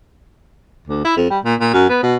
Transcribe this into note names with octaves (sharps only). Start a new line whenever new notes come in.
D2
E4
F2
G3
A#2
A#2
F#2
B3
B2